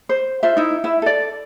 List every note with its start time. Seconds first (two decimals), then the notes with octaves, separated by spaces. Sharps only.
0.09 C5
0.43 F4 C5 E5
0.57 D#4 E4
0.84 E4 E5
1.02 A4 D5